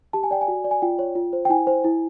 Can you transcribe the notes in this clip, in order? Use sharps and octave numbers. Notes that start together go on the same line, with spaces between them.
G4 A5
G#5
D5 G5
G#5
F#4
D5
G#5
F4 G5
C#5
F4
C5
G5
E4 G#5
C5
E4